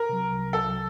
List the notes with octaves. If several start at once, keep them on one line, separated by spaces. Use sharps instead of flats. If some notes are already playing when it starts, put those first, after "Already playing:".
Already playing: A#4
C3 F#3
C2
C3 F#3
C2 A4
C3 F#3